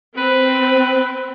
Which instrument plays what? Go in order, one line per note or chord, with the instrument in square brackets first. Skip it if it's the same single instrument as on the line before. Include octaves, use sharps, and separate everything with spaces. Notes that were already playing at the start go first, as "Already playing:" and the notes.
[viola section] C4 [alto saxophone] B4